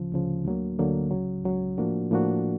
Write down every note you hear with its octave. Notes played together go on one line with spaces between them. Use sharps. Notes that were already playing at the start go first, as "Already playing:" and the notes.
Already playing: D2 C#3 F3
D2 C#3 F3
D2 D3 F#3 A#3
D2 D3 F#3 A#3
C#2 C#3 F#3
C#2 C#3 F#3
A2 F3 A#3 D4 F#4
A2 F3 A#3 D4 F#4